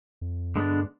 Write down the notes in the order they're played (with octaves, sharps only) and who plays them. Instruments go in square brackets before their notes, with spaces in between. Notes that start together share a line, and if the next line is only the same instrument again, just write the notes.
[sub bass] F2
[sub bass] G2 [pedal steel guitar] D3 G#3 B3 D4